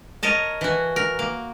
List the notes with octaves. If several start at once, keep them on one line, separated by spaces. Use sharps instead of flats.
A#4 C#5 D#5 A5
E3 F#4
A#4
A#3